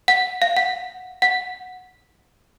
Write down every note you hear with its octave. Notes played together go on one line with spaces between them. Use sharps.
F#5
F5
F#5
F#5